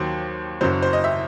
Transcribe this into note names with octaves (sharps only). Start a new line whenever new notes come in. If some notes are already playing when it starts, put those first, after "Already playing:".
Already playing: D#2 D#3 F#3 C5
F#1 F#2 F#3 C5
C5
D#5
E5